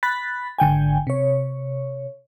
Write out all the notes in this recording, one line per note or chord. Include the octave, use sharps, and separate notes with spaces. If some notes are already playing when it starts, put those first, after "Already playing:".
B5 F#6 A6 B6
G#1 D3 G5 G#5
C3 C#5